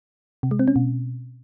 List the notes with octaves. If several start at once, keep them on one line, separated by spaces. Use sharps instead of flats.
C3
G#3
C4
C#4
B2